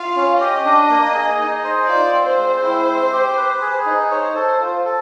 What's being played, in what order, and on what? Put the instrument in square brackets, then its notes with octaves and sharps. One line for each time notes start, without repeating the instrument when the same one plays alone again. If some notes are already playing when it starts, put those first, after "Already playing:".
Already playing: [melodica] F4 [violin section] F5
[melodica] C#4
[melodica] G4 [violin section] D#5
[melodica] D4
A#3
G#4
D#4
C5
[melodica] F4 [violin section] D5
[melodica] C4
[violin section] C5
[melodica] G#3
E4
C4
G4
B4
G#4
D#4
[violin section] C5 [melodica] C#5
[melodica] A4
F4
A4